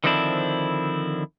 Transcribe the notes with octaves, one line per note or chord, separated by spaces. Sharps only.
D3 D#3 F3 C4 D4 E4